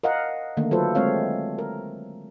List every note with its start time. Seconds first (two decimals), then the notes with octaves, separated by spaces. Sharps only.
0.03 A#4 D#5 F5 F#5
0.57 D3 D#3 A3 A#3
0.71 F#3 F4 A4 B4 C5
0.95 G#3 A3 C4 C#5 F5
1.59 A#4